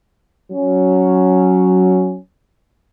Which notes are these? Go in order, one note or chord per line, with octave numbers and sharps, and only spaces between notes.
F#3 C#4